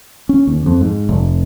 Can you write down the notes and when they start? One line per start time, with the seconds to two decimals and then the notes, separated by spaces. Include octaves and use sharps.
0.29 C#4
0.47 D#2
0.66 F2
0.81 G#2
1.09 F1